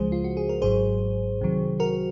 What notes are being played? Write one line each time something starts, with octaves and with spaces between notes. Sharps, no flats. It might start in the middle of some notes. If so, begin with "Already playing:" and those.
Already playing: C#2 C#3 F3 G#3 G#4 C5
F4
F#4
G#4
A#4
G#1 G#2 F#3 G#4 C5
C2 C3 D#3 F#3
F#4 A#4